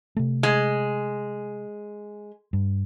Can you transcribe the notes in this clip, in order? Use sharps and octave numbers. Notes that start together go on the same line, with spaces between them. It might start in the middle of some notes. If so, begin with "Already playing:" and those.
C3 A3
G#3
G2